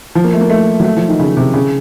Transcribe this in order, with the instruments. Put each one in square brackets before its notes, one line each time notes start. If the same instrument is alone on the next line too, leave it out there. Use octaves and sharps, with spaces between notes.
[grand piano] F3
A#3
A3
A#3
A3
F#3
A3
F3
D#3
C#3
C3
C#3